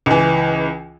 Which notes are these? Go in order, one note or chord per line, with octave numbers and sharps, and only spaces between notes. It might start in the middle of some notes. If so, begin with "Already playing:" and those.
C#2 E3